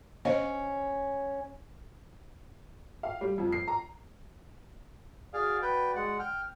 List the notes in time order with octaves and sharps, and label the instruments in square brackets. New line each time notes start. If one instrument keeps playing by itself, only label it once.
[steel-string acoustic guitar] C#4 [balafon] C5 D#5 F5
[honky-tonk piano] F5
G3
F2
C7
A#5
[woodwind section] F#4 D5 [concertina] G#4 F5
[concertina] B4 G5
G#3 F#5
G5 F6